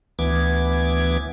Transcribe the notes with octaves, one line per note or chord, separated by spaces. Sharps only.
D2 E3 B3 D6 G#6